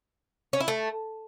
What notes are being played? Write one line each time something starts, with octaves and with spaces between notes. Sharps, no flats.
C#4
E4
A3